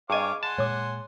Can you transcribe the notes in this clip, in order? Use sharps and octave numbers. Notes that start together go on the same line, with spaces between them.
G2 G#4 C#5 D#5 F5 G#5 D6
F#5 G#5 A5 C6
A#2 G#3 C#5 D6